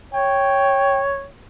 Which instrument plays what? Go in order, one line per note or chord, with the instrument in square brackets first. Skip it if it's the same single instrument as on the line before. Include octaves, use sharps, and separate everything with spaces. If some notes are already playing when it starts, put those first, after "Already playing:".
[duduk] C#5 [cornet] G5